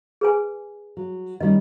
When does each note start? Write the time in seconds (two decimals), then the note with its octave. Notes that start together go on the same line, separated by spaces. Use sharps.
0.21 G#4 B4 G#5
0.97 F#3
1.40 D#3 G3 C#4 D#5